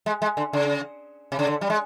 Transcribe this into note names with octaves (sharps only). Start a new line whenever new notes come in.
G#3
G#3
D3
C#3
C3
C#3
D3
G3
G#3